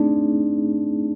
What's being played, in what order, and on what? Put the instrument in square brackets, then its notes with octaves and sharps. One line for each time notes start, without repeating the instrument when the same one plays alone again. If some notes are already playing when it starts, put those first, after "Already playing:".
Already playing: [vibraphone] A3 C4 D#4 G#4 [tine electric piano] D4